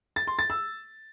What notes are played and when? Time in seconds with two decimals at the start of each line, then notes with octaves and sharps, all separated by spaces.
0.16 A6
0.27 C6
0.39 A6
0.50 E6